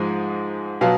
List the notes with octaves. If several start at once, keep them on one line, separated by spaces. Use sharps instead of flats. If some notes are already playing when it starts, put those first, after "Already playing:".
Already playing: G#2 F3 G#3
B2 F#3 F5